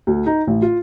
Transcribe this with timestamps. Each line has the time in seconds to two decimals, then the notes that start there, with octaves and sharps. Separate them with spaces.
0.07 D2
0.26 D#4
0.47 A1
0.62 F4